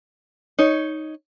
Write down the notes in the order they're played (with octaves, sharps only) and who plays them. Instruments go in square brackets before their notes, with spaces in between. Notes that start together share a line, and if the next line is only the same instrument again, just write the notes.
[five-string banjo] D#4 C#5